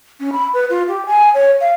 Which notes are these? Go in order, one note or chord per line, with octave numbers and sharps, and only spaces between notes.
C#4
B5
B4
F4
G4
G#5
C#5
F5